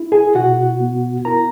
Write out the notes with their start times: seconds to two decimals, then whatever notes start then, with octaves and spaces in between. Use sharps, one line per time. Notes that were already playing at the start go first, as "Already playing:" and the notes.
Already playing: E4
0.12 G#4 G#5
0.35 B2 F#4 F#5
0.80 B3
1.25 E4 A#4 A#5